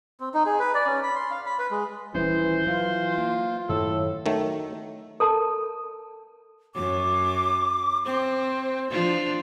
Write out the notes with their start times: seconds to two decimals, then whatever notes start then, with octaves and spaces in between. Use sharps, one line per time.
0.20 C4
0.34 D#4
0.46 G#4
0.59 B4
0.74 D5
0.86 C#4
1.03 B5
1.16 C6
1.31 F5
1.46 B5
1.59 B4
1.71 G#3
2.15 D#1 E3 G3 C#4 C5
2.67 E3 F#3 F4
3.18 A#3
3.69 F#2 A2 D#3 A4
4.26 D#3 F#3 A3
5.20 A4 A#4 A5
6.75 F#2 D6
8.05 C4 C5
8.90 F3 D4 F4